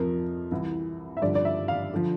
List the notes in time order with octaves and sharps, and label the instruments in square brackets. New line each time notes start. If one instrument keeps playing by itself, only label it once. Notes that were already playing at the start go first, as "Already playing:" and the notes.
Already playing: [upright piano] F2 C3 F3 A#4
C2 C3 E3
E5
G2 D3 F3 D5
D5
E5
F5
D3 F3